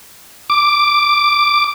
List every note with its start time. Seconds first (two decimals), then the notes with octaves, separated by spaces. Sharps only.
0.50 D6